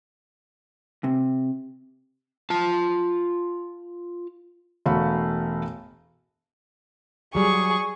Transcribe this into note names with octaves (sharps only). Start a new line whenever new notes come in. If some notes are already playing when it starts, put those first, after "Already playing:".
C3
F4 A5
E1 A3 F#4 F5 B5
F#3 G3 G#4 C#6